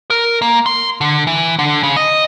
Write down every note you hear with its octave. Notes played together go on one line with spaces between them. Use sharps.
A#4
A#3
C6
D3
E3
D3
C#3
D#5